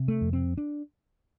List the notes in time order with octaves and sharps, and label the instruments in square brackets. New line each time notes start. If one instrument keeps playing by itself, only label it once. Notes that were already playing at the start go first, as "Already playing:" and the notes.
Already playing: [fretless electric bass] C3
A3
F2
C4
D4